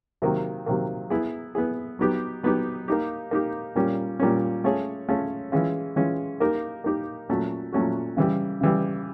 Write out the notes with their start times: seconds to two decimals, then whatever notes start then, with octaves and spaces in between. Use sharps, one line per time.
0.22 C3 D#3 F#3 A#3
0.66 C3 D#3 F#3 A#3
1.10 B3 E4 G#4
1.55 B3 E4 G#4
1.99 F#3 B3 D#4 G4
2.43 F#3 B3 D#4 G4
2.88 A#3 D#4 G4
3.31 A#3 D#4 G4
3.75 A#2 G3 A#3 C#4
4.19 A#2 G3 A#3 C#4
4.64 A3 C#4 F4 G#4 C#5
5.09 A3 C#4 F4 G#4 C#5
5.52 E3 G#3 C#4 F4
5.96 E3 G#3 C#4 F4
6.40 A#3 D#4 G4 A#4
6.84 A#3 D#4 G4 A#4
7.29 A#2 F#3 A3 C#4 F#4
7.73 A#2 F#3 A3 C#4 F#4
8.17 C#3 E3 G3
8.61 C#3 E3 G3